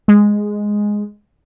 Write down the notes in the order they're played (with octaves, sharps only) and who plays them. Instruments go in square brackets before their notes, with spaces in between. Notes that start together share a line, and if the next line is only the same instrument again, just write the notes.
[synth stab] G#3